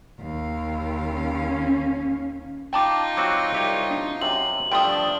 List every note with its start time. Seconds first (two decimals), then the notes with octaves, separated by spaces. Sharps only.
0.20 D#2 F5
1.06 C#4
2.73 D#4 F4 G5 A5 D6
3.17 F#3 C4 F#4 D6
3.52 C2 G4 C#5
3.91 D4
4.21 F#2 C3 F#7
4.72 G2 F3 A3 D4 G5 C6 D#6